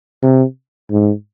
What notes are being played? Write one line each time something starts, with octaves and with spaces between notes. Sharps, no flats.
C3
G#2